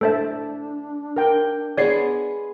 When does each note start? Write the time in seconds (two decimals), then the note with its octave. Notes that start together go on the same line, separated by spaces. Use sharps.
0.01 A3 D4 A4 C5 E5 A5
1.16 A#4 G5
1.77 G#3 B3 G#4 C#5 D5 C7